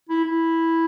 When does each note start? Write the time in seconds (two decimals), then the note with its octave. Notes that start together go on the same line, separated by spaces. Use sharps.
0.09 E4
0.25 E4